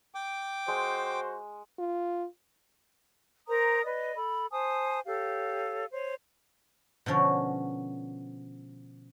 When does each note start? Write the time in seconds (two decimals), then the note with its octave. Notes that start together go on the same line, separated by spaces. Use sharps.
0.15 G5 D6
0.68 G#3 F#4 C5
1.79 F4
3.47 A#4 C5 A#5 D#6
3.84 B4 D5 D#5
4.16 A4 B5
4.51 C5 G#5 A5 D#6
5.06 G4 A4 C#5 F5
5.91 C5 C#5
7.06 B2 D3 F3 C#4